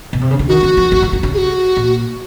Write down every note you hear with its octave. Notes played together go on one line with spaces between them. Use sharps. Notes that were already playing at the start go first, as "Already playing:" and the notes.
B2
C3
C#3
D3
D#3 F#4
E3
F3
E3
E3
D#3
C#3
G#4
F#4
A#2